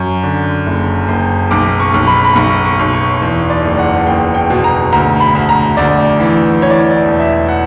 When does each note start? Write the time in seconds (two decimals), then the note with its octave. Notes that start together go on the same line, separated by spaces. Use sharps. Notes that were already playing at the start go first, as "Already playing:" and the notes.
Already playing: F#2 C#6
0.23 D3
0.66 F#1
1.08 F#1
1.51 B1 D6
1.80 C#6
1.94 B1
2.07 B5
2.25 B5
2.36 B1 C#6
2.65 C#6
2.79 B1
2.94 C#6
3.22 E2
3.50 D5
3.65 F#1
3.78 F#5
4.06 F#1 G5
4.35 G5
4.50 B2
4.64 A#5
4.92 D2 A#5
5.20 B5
5.35 D2
5.49 A#5
5.77 D2 D5
6.20 E3
6.62 E3 C#5
6.70 D5
6.79 C#5
6.91 D5
7.05 E1
7.19 E5
7.48 F#5